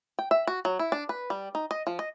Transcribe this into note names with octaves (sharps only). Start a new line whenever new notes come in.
G5
E5
F#4
F#3
E4
D4
B4
G3
D#4
D#5
F3
D#5